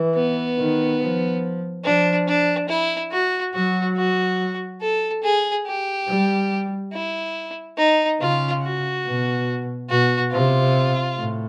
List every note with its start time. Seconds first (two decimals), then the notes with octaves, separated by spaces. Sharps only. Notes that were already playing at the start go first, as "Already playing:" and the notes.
Already playing: E3
0.15 B3
0.58 D#3
1.00 F3
1.85 F3 D4
2.27 D4
2.69 E4
3.12 F#4
3.54 F#3 F#4
3.96 F#4
4.81 A4
5.23 G#4
5.66 G4
6.08 G3
6.93 E4
7.78 D#4
8.20 C#3 F4
8.63 F#4
9.04 B2
9.90 B2 F#4
10.32 C3 F4
11.17 A2